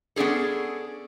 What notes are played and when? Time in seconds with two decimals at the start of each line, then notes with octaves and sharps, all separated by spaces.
0.16 B3 C#4 D4 G#4 A4